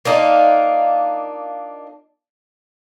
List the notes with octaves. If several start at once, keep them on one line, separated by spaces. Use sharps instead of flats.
A#3 D4 D#4 F4